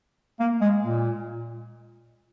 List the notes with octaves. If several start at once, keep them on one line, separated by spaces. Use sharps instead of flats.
A#3
G#3
A#2